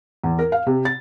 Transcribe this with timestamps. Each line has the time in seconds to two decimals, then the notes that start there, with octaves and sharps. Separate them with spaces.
0.24 E2
0.39 A#4
0.52 F5
0.67 C3
0.85 A6